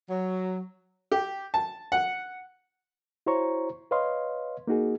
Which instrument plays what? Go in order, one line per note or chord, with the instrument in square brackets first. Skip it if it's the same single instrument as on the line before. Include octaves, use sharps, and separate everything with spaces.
[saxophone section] F#3
[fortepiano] G4
A5
F#5
[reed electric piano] E4 F#4 C5 C#5 A#5 C#6
B4 C#5 D#5 F5 C6
A#3 D#4 F#4 G#4